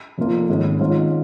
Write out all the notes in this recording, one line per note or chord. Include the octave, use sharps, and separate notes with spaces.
F1 F2 F3 A#3 F4
G#1 G#2 G#3 C#4
G#1 G#2 G#3 C#4 F4